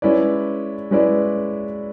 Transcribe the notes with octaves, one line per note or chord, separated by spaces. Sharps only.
G#3 C#4 E4 B4 D5
G#3 C#4 E4 B4 D5